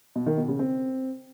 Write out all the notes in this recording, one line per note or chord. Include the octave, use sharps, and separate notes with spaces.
B2
D#3
B2
C#3
C4